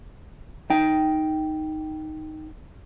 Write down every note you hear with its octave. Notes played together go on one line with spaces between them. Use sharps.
D#4 G5